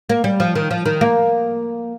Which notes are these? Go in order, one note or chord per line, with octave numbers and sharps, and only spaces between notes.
A#3
G3
F3
D#3
F3
D#3
A#3